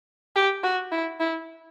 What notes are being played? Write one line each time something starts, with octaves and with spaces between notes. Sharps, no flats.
G4
F#4
E4
E4